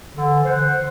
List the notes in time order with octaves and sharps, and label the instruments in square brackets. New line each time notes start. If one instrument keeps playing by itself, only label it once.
[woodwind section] D3 E3
C5 F#5